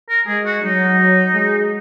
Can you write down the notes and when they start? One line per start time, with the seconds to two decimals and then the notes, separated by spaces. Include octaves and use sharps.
0.09 A#4
0.27 G#3 G#4
0.45 F#4
0.63 F#3 D#4
1.34 G#3